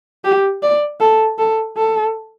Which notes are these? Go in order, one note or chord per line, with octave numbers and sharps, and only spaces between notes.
G4
D5
A4
A4
A4